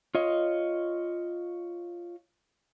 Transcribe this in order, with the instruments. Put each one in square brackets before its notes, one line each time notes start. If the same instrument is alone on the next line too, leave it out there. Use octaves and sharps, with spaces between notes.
[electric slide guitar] F4 C#5 D#5